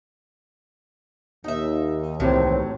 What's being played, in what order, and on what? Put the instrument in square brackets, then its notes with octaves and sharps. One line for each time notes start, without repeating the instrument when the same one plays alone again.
[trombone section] D#2 [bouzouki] D#4 E5
[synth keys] C2 C3 E3 [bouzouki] A2 F#3 [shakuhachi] C4